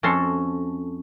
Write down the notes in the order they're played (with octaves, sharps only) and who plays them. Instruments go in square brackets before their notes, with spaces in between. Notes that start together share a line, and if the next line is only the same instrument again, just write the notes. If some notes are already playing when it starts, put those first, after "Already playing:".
[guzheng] F2 C#4 F#4 A4 C6